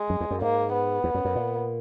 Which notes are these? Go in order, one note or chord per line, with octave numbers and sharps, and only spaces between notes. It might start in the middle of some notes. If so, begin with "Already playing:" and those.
Already playing: G#3
F#2
E2
F#2
G#2 A#3
B3
E2
F#2
F#2
A#2